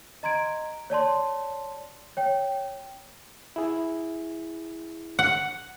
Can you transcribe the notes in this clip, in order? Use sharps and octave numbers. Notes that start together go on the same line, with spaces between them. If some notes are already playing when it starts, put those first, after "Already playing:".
D#5 A#5 C6 G#6 D7
C#5 D5 A5 C6
C#5 G5
E4 G#4
F#5